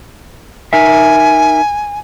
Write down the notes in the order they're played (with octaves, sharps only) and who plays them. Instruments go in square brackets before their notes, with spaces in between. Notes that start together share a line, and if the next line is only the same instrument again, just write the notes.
[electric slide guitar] D#4 A#4 E5 [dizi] G#5